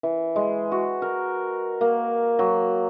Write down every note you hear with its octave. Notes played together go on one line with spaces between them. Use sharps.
E3
G#3
F#4
A#4
A#3
F#3